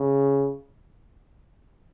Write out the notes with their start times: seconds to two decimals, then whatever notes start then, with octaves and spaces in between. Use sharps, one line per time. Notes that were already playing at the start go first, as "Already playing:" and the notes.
Already playing: C#3